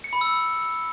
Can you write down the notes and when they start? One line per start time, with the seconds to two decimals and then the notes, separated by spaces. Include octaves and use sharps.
0.04 C#7
0.13 B5
0.21 E6